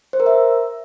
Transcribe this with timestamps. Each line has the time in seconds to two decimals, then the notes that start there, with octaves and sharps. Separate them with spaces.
0.13 C5
0.20 A#4
0.26 E5